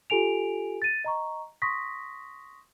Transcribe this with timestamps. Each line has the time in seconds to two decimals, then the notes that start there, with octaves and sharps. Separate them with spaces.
0.10 F4 G4 A4 G#5 D7 F7
0.82 A6 D#7
1.04 D#5 A#5 C#6
1.62 C6 C#6 D#6 A#6 B6